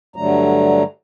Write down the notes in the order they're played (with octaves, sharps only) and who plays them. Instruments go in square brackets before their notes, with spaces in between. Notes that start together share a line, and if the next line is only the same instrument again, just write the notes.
[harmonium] G2 D3 F#3 G3 A3 A#5